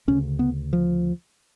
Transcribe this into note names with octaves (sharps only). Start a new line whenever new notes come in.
D2 C#3 C#4
B3
F3